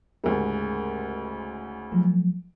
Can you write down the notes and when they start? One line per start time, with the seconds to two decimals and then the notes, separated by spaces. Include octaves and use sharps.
0.24 D2 G#2 C#3 G#3 G4 A#4
1.92 F3 F#3 A3